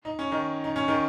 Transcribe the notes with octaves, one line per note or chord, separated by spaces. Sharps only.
D#4
C#4
D#3 D#4
D#4
C#4
D#3 D#4